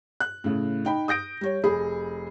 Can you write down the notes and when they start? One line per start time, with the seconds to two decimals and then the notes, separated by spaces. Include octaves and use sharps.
0.20 F#6
0.44 A2 C#3
0.85 D#4 G5 B5
1.08 D#6 G6 A#6 D7
1.41 G3 C#5
1.64 F1 G#4 B5